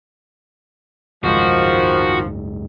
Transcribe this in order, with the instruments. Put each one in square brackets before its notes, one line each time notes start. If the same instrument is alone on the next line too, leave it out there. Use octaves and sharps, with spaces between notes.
[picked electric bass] F#1 C#2 G#2 [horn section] D#3 F3 [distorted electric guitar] F#4